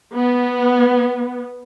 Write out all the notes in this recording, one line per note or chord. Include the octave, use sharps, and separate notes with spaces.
B3